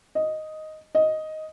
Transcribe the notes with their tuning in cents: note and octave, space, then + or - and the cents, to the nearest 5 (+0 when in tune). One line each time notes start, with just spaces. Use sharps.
D#5 +0
D#5 +5